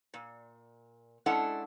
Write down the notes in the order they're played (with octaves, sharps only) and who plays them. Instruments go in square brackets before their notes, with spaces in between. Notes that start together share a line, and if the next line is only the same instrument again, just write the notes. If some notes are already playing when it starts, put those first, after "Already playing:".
[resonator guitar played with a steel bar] A#2
G#3 C#4 D4 E4 A4 F#5